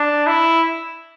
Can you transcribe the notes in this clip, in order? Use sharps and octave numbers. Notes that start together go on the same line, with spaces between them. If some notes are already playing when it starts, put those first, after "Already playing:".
Already playing: D4
E4